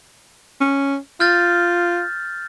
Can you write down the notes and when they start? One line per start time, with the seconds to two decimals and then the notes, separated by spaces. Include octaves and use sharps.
0.61 C#4
1.20 F4 F6 G6 A6